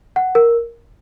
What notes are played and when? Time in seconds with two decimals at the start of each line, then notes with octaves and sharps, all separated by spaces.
0.16 F#5
0.35 A#4